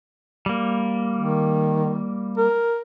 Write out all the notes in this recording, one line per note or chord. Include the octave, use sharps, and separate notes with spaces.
G3 A#3
D#3
A#4